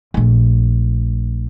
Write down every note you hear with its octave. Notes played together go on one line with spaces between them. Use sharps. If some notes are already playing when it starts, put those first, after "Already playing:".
A#1 A3